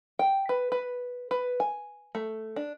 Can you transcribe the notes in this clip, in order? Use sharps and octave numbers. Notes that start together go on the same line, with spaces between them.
G5
B4
B4
B4
G#5
A3
D4